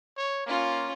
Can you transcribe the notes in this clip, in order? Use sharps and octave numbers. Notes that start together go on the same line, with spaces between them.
C#5
A#3 C#4 F4